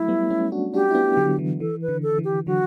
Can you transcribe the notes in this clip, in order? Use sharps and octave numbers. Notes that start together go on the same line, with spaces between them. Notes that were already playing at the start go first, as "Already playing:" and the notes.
Already playing: F#3 A3 E4
G3 B3
A3 C#4
D4 F#4
D4 F#4 G4
E4
B3 D4
D3 F#3
E3
E3 A4
B4
D3
A4
E3
G4
D3 F#3 F#4